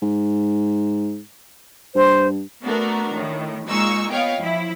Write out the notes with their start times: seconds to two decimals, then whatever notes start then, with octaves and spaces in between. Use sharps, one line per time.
0.02 G#2
1.95 G2 C5
2.64 A3 B3 D4 F#4 A#4
3.13 A2 D#3
3.67 A#2 G#3 D#4 G#4 C#6 E6
4.11 B3 C#5 D#5 F5 G5
4.39 F3 E4